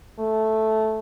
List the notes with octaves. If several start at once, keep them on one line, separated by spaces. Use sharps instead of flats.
A3